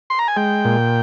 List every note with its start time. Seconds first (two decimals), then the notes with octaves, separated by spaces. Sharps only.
0.10 C6
0.19 A#5
0.28 G#5
0.37 G#3 G5
0.65 A#2